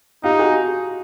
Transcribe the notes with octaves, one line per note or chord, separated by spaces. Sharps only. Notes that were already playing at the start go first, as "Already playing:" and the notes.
D#4 F4 G4
F#4 G#4